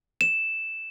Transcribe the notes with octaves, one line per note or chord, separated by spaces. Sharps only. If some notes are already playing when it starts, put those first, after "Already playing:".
E7